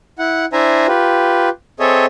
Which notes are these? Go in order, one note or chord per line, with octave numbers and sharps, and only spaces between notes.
E4 F#5
D4 E4 C5 E5 G#5 A#5
F4 G4 B4
C4 G#4 A4 C#5 D#5 E5